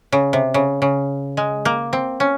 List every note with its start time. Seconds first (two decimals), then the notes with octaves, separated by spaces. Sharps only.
0.12 C#3
0.33 C3
0.54 C#3
0.82 C#3
1.37 G#3
1.65 A#3
1.93 C4
2.20 C#4